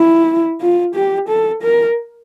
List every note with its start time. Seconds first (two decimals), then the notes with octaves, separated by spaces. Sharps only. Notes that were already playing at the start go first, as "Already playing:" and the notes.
Already playing: E4
0.61 F4
0.95 G4
1.28 A4
1.62 A#4